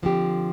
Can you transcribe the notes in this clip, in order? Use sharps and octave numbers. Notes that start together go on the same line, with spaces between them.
D3 F3 C4 G4